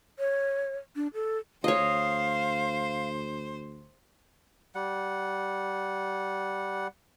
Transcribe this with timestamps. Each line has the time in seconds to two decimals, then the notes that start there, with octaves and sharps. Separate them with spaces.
0.19 C#5
0.96 D4
1.14 A4
1.64 D2 C5 C#5 D#5 F5
4.75 G3 F#5